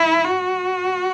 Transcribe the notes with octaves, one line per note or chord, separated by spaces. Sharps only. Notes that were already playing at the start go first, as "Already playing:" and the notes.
Already playing: E4
F#4